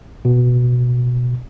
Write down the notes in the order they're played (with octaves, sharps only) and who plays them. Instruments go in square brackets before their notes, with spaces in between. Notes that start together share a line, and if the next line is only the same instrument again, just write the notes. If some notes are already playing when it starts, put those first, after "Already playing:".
[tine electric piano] B2